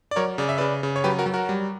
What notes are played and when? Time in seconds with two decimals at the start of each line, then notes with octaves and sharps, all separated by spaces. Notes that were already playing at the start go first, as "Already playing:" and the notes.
0.11 D5
0.16 F#3 A#4 C#5
0.38 C#3 D5
0.49 E5
0.58 C#3 B4 D5
0.83 C#3
0.96 C#5
1.04 F#3 G4 B4
1.19 F#4 A#4
1.26 F#3
1.34 F#4 A#4
1.49 G3